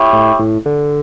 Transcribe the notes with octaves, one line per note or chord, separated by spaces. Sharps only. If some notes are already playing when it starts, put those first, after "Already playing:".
Already playing: E4 G4 C#5
A2
A2
D3